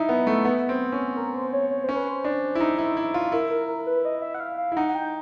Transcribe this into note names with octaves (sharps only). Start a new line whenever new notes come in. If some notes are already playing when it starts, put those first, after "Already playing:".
Already playing: D#4 E4 E5
B3
A3
B3
C4
C#4
A#4
C5
C#5
C#5
C#4 C5
B4
C5
D4
E4
D#4
E4
E4
F4
E4 A#4
A#4
A#4
B4
D#5
E5
F#5
F5
F5
E4
D#4 F#5
F#5
G5